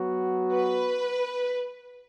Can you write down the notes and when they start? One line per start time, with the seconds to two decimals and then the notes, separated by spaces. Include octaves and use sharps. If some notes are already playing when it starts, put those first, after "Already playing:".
Already playing: F#3 B3 F#4
0.53 B4